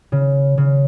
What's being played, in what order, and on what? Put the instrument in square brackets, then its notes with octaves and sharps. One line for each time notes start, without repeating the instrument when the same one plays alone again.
[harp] C#3
C#3